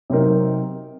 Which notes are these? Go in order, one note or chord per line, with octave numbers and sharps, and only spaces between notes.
C3 F#3 C4 D#4 A#4